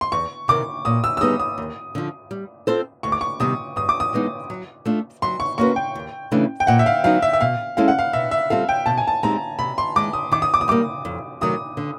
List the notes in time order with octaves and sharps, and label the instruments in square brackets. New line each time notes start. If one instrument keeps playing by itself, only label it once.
[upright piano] C6
[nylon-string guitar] E2 [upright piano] C#6
[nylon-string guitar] C3 D#3 G3 A#3 [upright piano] D6
[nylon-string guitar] A#2 [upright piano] D#6
[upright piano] E6
E6
[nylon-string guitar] G3 B3 D#4 G#4 [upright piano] D#6
[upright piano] D#6
[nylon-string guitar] D#2
D3 F3
G3
C4 F4 A4 C5
[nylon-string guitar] D2 [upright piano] C#6
[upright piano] D6
C#6
[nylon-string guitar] C3 D#3 G3 B3 [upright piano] D#6
[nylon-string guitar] G2 [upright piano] D#6
[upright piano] D6
D#6
[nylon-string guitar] E3 G#3 B3 D#4
F#3
A3 D4 F4
[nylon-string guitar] F#3 [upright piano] C6
[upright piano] C#6
[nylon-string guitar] A#3 C#4 F#4 B4 [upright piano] C#6
[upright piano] G5
[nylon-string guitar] D#2
C#3 E3 A3 D4
[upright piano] G5
[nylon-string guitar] A#2 [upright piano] F#5
[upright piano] E5
F5
[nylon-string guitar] F#3 B3 D#4 [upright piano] F5
[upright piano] E5
E5
[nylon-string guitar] B2 [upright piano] F5
[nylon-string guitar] G#3 C#4 E4 A4 [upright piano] F5
[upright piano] F#5
F5
[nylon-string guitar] B2 [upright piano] E5
[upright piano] E5
[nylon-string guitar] G3 C4 F4 A4 [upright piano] F5
[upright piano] G5
[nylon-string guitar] B2 [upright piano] A5
[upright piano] G#5
A5
[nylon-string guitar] G#3 C4 D#4 G4 [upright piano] A#5
[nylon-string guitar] C3 [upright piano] B5
[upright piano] C6
[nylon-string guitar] D#3 G#3 [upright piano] D6
[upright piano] D#6
[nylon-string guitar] D#3 [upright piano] D6
[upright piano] D#6
D6
D#6
[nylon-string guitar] G3 A#3 [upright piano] D6
[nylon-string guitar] F2
[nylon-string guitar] C3 D#3 F#3 A3 [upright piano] D#6
[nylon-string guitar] D3